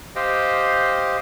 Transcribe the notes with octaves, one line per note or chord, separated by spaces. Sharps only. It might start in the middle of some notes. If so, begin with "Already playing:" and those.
G4 C5 D#5 F5 G5